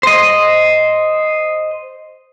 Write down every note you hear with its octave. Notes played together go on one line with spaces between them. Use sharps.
C5 D#5